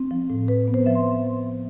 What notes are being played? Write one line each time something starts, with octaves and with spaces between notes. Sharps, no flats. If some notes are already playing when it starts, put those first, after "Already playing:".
Already playing: C4
F3
A2
A2 B4
B4
B3
C5
F3 E5
C6